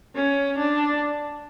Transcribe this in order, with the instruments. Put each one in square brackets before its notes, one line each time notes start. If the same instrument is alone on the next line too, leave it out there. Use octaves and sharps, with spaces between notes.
[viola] C#4
D4